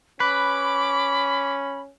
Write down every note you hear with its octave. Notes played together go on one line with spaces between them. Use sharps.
C#4 B4 B5 D6